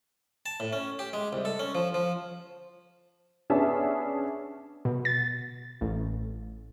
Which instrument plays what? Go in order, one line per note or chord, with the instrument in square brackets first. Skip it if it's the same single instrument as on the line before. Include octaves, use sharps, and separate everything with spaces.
[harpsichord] A5
A2
C#4
G4
G#3
C2
A4
C#4
F3
F3
[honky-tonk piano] B3 C#4 D4 G#4 E5 A5
[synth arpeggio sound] B2
A6
A1